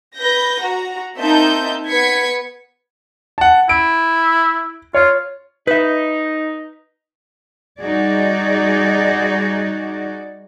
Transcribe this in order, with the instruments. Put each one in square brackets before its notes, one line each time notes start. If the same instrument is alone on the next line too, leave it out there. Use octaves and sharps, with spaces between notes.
[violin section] B4 G6 A#6
F#4 A#5
A#3 C4 D#4 E5 A5 G6
B3 B4 G#6 B6 C#7
[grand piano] F#5 A5
[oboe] E4 [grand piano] D7
[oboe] F4 [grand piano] C#5
[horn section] D#4 [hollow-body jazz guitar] B4 E5
[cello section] G3 D#4 F#4 G#4 D5